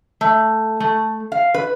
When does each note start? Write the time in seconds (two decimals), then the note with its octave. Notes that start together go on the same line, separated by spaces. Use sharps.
0.21 A3
0.80 A3
1.32 F5
1.54 B4